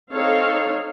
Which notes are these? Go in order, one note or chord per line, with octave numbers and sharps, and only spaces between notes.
C4 D#4 A4 C#5 F5